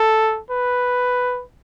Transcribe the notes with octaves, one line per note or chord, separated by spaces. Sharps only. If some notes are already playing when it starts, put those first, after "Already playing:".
Already playing: A4
B4